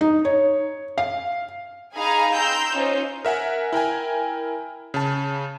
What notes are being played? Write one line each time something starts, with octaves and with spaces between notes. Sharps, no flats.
D#4
C#5
F5
D#4 G#4 F5 G#5 A#5 B5
G5 A#5 C6 E6 G6
C#4 D#4 F4 C5
A#4 E5 F#5 G#5
E4 A#4 G5 G#5
C#3 A5